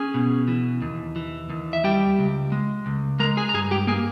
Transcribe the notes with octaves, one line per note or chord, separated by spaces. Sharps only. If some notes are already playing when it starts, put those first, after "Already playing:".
Already playing: C#4 G#4 G#5
B2
E3
D#2
E3
D#2
E5
G3 G4 G5
C#2
G#3
C#2
G#3 A#4 A#5
G#4 G#5
A#5
G2 G#4 G#5
G4 G5
A#3 G#4 G#5